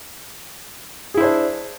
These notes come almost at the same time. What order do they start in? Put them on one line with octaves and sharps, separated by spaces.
G#4 E4 C5 D4